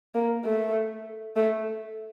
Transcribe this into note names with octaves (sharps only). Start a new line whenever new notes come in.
A#3
A3
A3